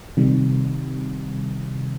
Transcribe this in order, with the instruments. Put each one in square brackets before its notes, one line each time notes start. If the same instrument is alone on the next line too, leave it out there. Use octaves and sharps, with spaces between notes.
[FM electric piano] C3 D#3 G3